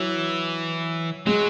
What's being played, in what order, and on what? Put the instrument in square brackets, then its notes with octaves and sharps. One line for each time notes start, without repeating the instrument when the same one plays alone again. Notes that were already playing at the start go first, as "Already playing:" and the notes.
Already playing: [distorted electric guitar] E3 [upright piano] F#3
[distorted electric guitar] F#3 [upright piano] G#3